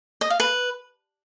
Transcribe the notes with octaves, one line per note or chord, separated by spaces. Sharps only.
D#5
F5
B4